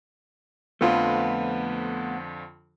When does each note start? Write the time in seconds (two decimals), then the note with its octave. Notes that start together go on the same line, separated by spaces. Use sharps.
0.81 F2 D3 F3 A3 B3 F4